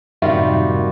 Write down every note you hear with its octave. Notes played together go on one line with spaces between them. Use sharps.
F#2 A2 C3 D#3 G3 F4 F#4 E5